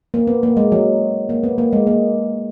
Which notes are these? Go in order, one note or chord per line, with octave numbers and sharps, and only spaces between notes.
A#3
B3
A#3
G#3
F#3
A#3
B3
A#3
G#3
A#3